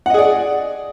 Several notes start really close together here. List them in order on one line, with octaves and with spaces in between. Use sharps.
F#5 D#5 G#4 D5